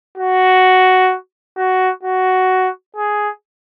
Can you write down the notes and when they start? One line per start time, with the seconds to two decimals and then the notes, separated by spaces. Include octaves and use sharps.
0.17 F#4
1.57 F#4
2.03 F#4
2.96 G#4